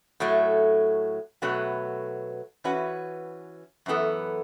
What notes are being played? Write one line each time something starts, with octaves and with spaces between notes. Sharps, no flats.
A2 F#3 A3
B2 F#3 A3 F#4 B4
E3 C#4 F#4 B4
F#2 E3 B3 A4